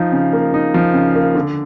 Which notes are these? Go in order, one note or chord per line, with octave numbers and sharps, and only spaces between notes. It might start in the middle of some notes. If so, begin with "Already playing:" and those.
Already playing: F3 D#4
C#3
A#3
D#4
F3
C#3
A#3
D3